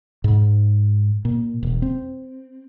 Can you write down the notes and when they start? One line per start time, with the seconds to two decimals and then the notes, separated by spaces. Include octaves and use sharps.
0.24 G#2
1.25 A#2
1.63 E1
1.82 C4